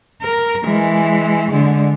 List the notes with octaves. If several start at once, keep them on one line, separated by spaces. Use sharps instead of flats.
A#4
E3 G#3
D3 G#3